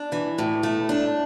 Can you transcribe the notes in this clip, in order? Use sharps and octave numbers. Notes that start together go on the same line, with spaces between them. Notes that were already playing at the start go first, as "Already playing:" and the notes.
Already playing: D4
E3
A2
A3
D4